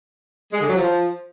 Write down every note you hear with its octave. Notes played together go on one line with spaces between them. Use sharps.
G#3
D3
F#3
F3